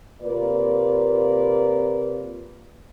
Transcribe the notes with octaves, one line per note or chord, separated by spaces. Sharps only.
C3 A#3 F4 A#4 B4 D5